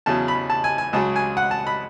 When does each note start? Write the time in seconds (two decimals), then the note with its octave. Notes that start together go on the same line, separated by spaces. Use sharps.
0.06 E2 C#3 F#3 A5
0.28 B5
0.50 A5
0.64 G#5
0.78 G#5
0.93 C#2 C#3 F#3 A5
1.16 G#5
1.37 F#5
1.51 A5
1.67 B5